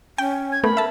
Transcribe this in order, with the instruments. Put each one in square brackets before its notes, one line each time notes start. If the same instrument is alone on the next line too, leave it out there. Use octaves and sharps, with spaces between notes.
[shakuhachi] C#4 [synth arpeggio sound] G5
[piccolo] G#6
[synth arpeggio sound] A3 B3 [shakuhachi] A#4 [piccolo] B5
[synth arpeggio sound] E5 A5